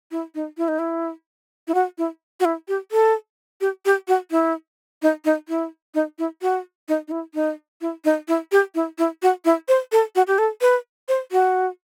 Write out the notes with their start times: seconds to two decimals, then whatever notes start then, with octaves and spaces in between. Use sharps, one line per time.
0.11 E4
0.35 D#4
0.58 E4
0.68 D#4
0.79 E4
1.68 E4
1.74 F#4
1.98 E4
2.40 F#4
2.45 E4
2.68 G4
2.92 A4
3.61 G4
3.85 G4
4.08 F#4
4.31 E4
5.02 D#4
5.25 D#4
5.49 E4
5.95 D#4
6.19 E4
6.42 F#4
6.88 D#4
7.08 D#4
7.11 E4
7.34 D#4
7.81 E4
8.05 D#4
8.28 E4
8.52 G4
8.75 E4
8.98 E4
9.22 F#4
9.45 E4
9.68 C5
9.92 A4
10.15 F#4
10.27 G4
10.38 A4
10.61 B4
11.08 C5
11.32 F#4